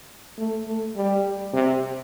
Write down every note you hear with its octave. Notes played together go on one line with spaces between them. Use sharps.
A3
A3
G3
C3